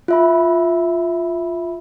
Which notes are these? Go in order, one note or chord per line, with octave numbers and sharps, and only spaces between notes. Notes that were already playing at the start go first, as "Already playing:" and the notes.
F4 E5 B5